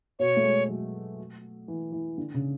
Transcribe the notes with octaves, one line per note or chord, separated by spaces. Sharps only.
B2 C#5
A3
G#3
F#3
E3
E3
D3
C#3